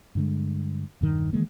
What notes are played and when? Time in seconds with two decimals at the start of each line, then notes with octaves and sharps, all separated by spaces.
0.15 G2 D3 G#3
1.01 E1 G2 D#3
1.33 D#3 E3 G#3 A#3